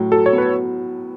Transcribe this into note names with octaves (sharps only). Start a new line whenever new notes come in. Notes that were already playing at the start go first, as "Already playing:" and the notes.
Already playing: A2 F#3
F#3 A4
C#5
B3
B4